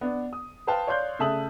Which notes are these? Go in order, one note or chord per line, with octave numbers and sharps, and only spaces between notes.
B3 D4
D#6
B4 C5 F5 G5 A5
C#5 D5 F5 C6 F#6 G6
C#3 A3 E5 A5 D#6 F#7